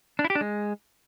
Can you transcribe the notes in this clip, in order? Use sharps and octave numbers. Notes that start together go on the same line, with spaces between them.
D4
E4
G4
D4
G#3